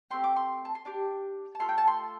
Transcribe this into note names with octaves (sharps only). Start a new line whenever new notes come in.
A3 C4 G4 C6
D6
C6
A5
C6
D4 G4 D6
A5
A3 F4 A4 C6
G5
A5
C6